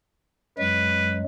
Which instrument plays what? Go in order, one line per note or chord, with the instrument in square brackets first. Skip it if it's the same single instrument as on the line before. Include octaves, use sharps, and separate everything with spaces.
[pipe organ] F#2 F#3 G#3 [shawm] B4